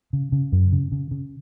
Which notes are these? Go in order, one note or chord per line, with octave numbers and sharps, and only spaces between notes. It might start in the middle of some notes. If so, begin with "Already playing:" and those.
C#3
C#3
F#2
C#3
C#3
C#3